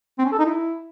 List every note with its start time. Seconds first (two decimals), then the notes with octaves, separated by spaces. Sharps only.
0.18 C4
0.25 C#4
0.32 A4
0.39 D#4
0.45 E4